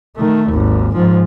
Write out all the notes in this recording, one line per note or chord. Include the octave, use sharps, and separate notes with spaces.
D#3 A3
G#1 D#2
G#2 F3